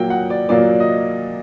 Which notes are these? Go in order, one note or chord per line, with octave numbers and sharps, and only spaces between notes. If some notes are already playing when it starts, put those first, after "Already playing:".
Already playing: A#2 F#3 A#3 G5
F#5
D5
A#2 F#3 A#3 D5
D#5